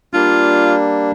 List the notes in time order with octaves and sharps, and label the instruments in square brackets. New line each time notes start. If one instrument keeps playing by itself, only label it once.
[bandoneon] G3 A#3 D4 [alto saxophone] F4